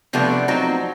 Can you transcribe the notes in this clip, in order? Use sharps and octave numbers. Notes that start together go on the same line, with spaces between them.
C3 F3 G3 A3 B3 D4
F3 F#3 C4 D#4